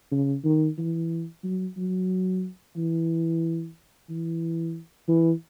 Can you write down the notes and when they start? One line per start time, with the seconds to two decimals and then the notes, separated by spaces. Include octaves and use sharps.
0.11 C#3
0.44 D#3
0.78 E3
1.44 F#3
1.77 F#3
2.76 E3
4.09 E3
5.08 E3